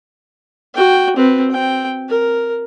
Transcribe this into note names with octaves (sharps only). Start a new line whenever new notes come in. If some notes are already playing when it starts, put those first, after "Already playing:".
F#4 G5
C4 B4
C4 G5
A#4